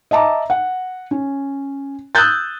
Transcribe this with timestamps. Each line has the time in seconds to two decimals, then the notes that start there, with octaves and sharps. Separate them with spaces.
0.11 D#5 E5 A5 A#5 D6
0.50 F#5
1.11 C#4
2.15 D#6 E6 F#6 G6 A6